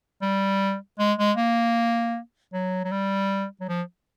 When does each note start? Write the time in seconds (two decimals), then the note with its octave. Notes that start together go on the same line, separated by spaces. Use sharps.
0.21 G3
0.99 G#3
1.18 G#3
1.37 A#3
2.53 F#3
2.84 F#3
2.91 G3
3.60 F#3
3.68 F3